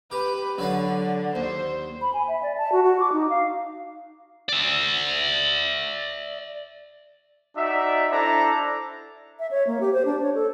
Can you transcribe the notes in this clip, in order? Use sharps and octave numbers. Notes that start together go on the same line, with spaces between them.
G4 B4
D3 F#3 B4 F5
D#2 C5
B5
G#5
E5
D5
A5
F#4
F#4
D6
D#4
F5
D5 E5
D#4 F#4 D5 E5
D4 E4 A4 C5 A#5
E5
C#5
A#3
G4
C5
D4
C#5
A4